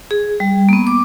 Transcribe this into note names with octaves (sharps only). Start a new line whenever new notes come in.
G#4
G3
A#3 B3
D6